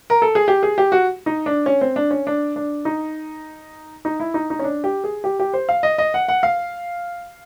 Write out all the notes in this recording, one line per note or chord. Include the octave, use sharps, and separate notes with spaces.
A#4
A4
G#4
G4
G#4
G4
F#4
D#4
D4
C#4
C4
D4
C#4
D4
D4
D#4
D#4
E4
D#4
D#4
C#4
D4
G4
G#4
G4
G4
C5
F5
D#5
D#5
F#5
F#5
F5